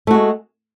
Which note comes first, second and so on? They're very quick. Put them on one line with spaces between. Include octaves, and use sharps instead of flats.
A3 F#4 G#3